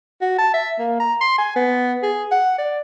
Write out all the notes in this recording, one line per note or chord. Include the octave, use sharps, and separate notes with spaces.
F#4
A5
E5
A#3
A#5
C6
G#5
B3
G#4
F#5
D5